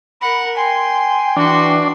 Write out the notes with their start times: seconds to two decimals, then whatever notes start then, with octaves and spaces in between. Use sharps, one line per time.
0.21 A#4 F#5 B5
0.57 G5 G#5 C6
1.37 E3 D4 F#4 C6